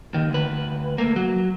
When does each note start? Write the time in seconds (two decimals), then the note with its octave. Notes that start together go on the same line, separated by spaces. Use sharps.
0.14 D#2 D#3
0.30 D2 B4
0.98 A3 A#3
1.16 F#3